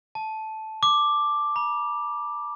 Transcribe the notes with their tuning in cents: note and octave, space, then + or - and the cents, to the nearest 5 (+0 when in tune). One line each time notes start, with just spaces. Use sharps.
A5 -10
D6 +5
B5 -45